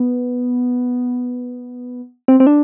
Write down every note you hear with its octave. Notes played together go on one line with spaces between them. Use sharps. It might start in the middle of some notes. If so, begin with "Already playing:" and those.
Already playing: B3
C4
C4
D4